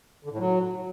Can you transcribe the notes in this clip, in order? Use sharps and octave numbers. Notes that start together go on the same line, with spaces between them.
D3
A2
F#3